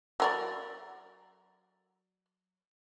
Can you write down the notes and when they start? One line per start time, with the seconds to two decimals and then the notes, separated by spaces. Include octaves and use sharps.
0.20 F#3 A#4 D5